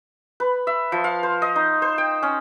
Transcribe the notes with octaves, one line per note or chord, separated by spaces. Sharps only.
B4
E5
F3
F5
C5
D#5
D#4
C5
G5
C#4